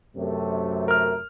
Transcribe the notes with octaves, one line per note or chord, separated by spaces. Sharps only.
F#2 C3 A3
A#4 F6